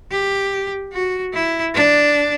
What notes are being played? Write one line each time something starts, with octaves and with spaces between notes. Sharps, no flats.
G4
F#4
E4
D4